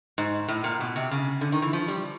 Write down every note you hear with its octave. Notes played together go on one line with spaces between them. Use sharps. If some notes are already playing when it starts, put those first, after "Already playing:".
G#2
A2
A#2
B2
C3
C#3
D3
D#3
E3
F3
G3